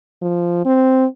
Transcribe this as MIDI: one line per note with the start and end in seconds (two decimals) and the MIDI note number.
0.22 0.63 53
0.65 1.05 60